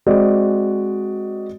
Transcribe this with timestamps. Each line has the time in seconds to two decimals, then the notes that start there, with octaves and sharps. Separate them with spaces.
0.06 G#3 C4 F#4 D5 D#5